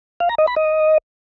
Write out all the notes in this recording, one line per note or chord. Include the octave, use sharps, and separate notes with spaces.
F5
A#5
D#5
B5
D#5